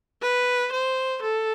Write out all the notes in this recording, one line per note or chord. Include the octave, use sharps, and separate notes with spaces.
B4
C5
A4